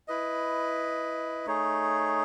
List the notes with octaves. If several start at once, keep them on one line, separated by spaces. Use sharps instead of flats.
E4 B4 D#5
A3 D#4 G#4 C#5